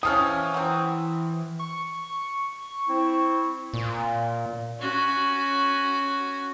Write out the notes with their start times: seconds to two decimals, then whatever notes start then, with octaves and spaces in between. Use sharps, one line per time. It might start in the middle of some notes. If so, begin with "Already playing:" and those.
0.03 C3 E3 F3 C#4 D#6 F6
0.54 F#3 C4
1.59 C#6
2.88 C4 E4
3.74 A#2
4.79 C#4 F#4